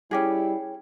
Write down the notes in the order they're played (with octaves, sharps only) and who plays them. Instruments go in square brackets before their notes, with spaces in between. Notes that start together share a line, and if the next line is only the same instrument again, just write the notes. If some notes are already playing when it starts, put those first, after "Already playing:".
[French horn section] G3 E4 [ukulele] C#4 G4 G#4